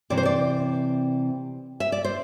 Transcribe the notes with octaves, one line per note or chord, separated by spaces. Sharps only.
C3 E3 C4 D5
C5
D5
E5
D5
C5